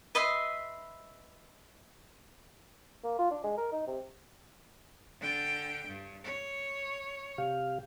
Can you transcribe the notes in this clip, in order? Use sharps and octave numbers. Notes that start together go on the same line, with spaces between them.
B4 D#5 E5 C6
A#3
F4
D4
G#3
A#4
D#4
C3
D3 G5
G2
C#5
C3 G4 F5